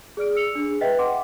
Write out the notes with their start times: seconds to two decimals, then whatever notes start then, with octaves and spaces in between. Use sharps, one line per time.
0.17 G#4 D5 F6 D7
0.36 E6 C#7 F7
0.55 D4 G#4
0.81 B4 D#5 E5 G5 B6
0.98 F#5 C6 D6